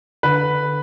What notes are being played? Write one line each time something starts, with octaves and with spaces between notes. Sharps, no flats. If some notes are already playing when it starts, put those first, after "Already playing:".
D3 B4